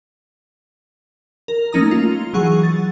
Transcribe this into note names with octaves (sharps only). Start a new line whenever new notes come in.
A#4
A3 A#3 C#4 D#4 A#5 D#6
F4
E3 F#3 G#4 F#5 C#6
A6